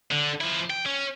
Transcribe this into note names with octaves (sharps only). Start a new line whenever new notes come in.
D3
F3 E4
G5
C#4